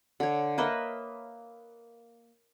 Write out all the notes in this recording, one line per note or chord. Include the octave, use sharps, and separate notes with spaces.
D3 C#5
A#3 B4 D#5 E5